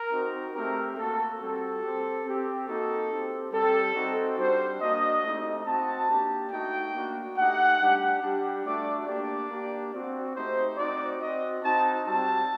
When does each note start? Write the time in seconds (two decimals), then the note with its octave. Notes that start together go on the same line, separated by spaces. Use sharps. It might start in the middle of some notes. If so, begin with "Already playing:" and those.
Already playing: A#4
0.12 C4 D#4 F#4
0.54 A3 C4 G4 A#4
0.97 A#3 F#4 A4
1.40 G3 C4 F#4 A4
1.82 C4 G4
2.25 C4 G4
2.68 A#3 D#4 F#4 A4
3.10 C4 G4
3.52 G3 C4 G4 A4
3.95 C4 D#4 F#4
4.38 G3 D4 F#4 C5
4.81 A#3 D4 F#4 D#5
5.23 A3 C4 D#4 G4
5.66 C4 F#4 A5
6.09 A#3 D4 G4
6.51 A3 D#4 F#4 G5
6.94 A#3 D4 F#4
7.36 A3 D#4 G4 F#5
7.79 G3 D4 G4
8.22 G3 D4 G4
8.65 A3 D4 F#4 D5
9.07 A#3 D4 G4 D5
9.49 A#3 D4 G4
9.93 C4 F#4
10.35 A3 D#4 G4 C5
10.77 C4 D#4 F#4 D5
11.20 C4 F#4 D#5
11.63 C4 D#4 F#4 A5
12.06 G3 C4 F#4 A5